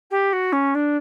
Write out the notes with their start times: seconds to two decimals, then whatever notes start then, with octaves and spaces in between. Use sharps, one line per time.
0.11 G4
0.32 F#4
0.52 C#4
0.75 D4